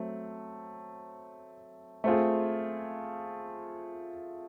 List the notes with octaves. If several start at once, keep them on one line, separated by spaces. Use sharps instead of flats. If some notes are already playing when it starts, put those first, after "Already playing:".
Already playing: F#3 A3 C4
A3 C4 F4 G#4